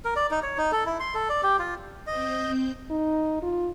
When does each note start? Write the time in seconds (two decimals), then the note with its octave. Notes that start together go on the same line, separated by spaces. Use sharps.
0.05 A#4
0.16 D5
0.31 D#4
0.43 C#5
0.58 D#4
0.72 A4
0.86 E4
1.00 C6
1.14 A4
1.29 D5
1.43 G4
1.59 F4
2.07 C4 D#5 G6
2.91 D#4
3.42 F4